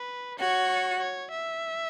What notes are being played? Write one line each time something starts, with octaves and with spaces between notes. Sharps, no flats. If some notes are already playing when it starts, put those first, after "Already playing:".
Already playing: B4
F#4 C#5
C#5
E5